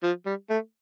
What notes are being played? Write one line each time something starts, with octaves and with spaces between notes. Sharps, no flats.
F3
G3
A3